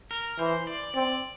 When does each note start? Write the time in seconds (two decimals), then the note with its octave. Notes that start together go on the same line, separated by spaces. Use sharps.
0.11 A#4
0.38 E3 C5
0.67 D5
0.94 C4 D5